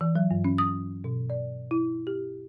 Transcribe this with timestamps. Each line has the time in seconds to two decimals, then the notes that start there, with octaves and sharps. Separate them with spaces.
0.01 E3
0.15 F#3
0.31 G2
0.44 C#4
0.58 D#6
1.04 B2
1.30 D5
1.71 E4
2.07 G4